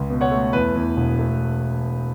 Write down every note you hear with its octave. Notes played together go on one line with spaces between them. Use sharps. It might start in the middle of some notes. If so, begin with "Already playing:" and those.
Already playing: C#2
B2
C#5 F#5
A3
E2 B4
E2
E1
A3